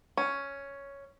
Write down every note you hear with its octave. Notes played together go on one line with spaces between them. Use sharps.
C#4